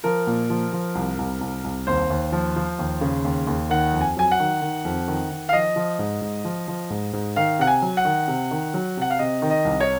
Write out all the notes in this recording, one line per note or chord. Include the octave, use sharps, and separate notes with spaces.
F3 A#4
A#2
F3
F3
C2
C2
C2
C2
D#2 C5
D#2
F3
F3
D#2
C#3
D#2
D#2
D#3 F#5
F2
G#5
F#3 G#5
F#5
D#3
D#3
F2
D#3
D#3
F5
F3 D#5
F3
G#2
G#2
F3
F3
G#2
G#2
D#3 F5
C3 F#5
G#5
F#3
F#5
D#3
C3
D#3
F#3
C3 F#5
F5
C3 D#5
D#3
D#5
C2
C#5